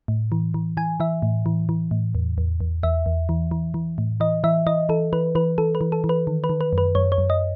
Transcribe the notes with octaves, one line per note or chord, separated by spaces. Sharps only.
A2
E3
E3
E3 G#5
E3 E5
A2
E3
E3
A2
E2
E2
E2
E2 E5
E2
E3
E3
E3
A2
E3 D#5
E3 E5
E3 D#5
E3 A4
E3 B4
E3 B4
E3 A4
B4
E3
A4
E3
B4
D#3
B4
D#3
B4
F#2
B4
F#2 C#5
C#5
F#2
D#5